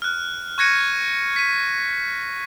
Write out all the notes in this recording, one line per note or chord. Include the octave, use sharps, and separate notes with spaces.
F6 F#6
C#6 F#6 G#6 A#6 C#7 D#7
B6 D#7